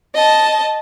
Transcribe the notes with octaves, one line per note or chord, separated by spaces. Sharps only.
D#5 A5